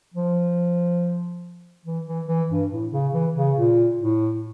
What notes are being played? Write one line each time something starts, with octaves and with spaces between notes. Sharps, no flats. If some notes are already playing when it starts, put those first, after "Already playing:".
F3
E3
E3
E3
G2
A2
C#3
E3
C#3
A#2
A2